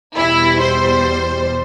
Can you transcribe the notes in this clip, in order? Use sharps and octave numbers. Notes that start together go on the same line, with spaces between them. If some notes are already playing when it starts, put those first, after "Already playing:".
E2 B2 G3 E4
C5